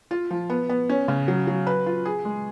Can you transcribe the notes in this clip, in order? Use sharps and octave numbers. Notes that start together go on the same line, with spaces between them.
F4
F3
B3
B3
C#4
C#3
F#3
F#3
B4
F4
G#4
G#3